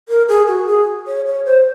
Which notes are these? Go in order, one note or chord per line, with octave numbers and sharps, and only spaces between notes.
A#4
G#4
F#4
G#4
C#5
C#5
C5